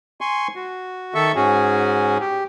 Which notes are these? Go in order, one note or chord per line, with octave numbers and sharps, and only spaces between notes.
G#5 C6 C#6
F#4
D#3 A4 E5 C#6
G#2 C#4 F#4 G#4
G4